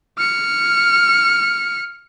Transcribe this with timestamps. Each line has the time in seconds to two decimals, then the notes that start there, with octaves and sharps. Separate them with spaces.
0.18 F6 C#7